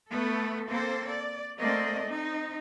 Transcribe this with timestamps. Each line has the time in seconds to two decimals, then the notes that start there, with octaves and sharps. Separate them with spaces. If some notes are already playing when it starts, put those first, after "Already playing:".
0.12 A3 B3 A4
0.68 A#3 C4 A4 C5
1.07 D5
1.59 A3 A#3 C4 D5 D#5
2.05 C4 D#4